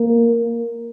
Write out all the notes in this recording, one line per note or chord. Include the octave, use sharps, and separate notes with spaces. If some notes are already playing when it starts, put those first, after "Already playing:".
Already playing: A#3